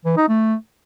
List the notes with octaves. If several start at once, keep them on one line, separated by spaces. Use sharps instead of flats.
E3
D#4
A3